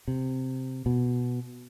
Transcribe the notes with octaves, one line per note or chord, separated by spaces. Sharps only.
C3
B2